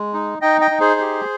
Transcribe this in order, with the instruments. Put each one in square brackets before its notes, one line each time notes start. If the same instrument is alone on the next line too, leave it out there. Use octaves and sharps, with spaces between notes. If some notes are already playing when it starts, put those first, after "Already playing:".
Already playing: [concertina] G#3
D#4
D#4 D#5 G5
D#5 G5
D#4
G#4 C5
G4